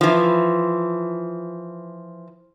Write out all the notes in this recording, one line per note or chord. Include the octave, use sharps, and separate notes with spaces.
E3 F3